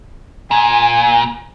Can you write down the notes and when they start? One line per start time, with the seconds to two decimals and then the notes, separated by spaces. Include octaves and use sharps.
0.51 A#2 G#5